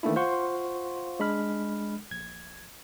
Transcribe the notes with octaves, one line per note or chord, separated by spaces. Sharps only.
D#3 E3 A3 A#3 D4 E4
F4 C5 F5 F#5 C6 C#6
G#3 D4 B5 F6
A#1 G#6